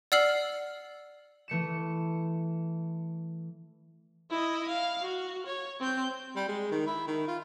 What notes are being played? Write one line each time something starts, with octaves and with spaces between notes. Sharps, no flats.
D5 F#5 E6 F6 C7 F#7
E3 A3 C#7 E7
E4 D#5
F5
F#4
C#5
C4 G6
G3
G#3
D#3
E4
D#3
F4